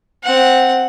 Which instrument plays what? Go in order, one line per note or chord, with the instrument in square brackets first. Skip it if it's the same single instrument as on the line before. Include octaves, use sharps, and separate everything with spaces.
[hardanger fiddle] C4 F#5